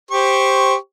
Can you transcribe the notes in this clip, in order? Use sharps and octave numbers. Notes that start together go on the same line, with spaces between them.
G4 C5 C#6